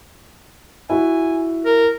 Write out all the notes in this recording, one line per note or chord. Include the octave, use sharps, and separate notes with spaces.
E4 F#4 G#5
A#4